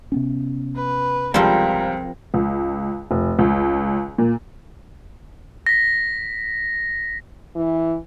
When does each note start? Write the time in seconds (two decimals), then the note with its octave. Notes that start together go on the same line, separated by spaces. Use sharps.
0.12 C3 B3 C#4
0.76 B4
1.34 C#2 F3 G3 C4 A#4
2.34 C#2
3.11 F1
3.39 C#2
4.18 A#2
5.66 A#6 B6
7.55 E3